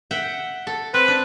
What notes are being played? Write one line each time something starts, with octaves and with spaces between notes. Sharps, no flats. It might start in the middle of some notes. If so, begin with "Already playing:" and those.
E5 F#5 G5
A4
C4 B4
D4